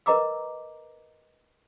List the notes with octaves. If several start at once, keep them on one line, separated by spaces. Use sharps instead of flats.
A#4 B4 D#5 A#5 D6 E6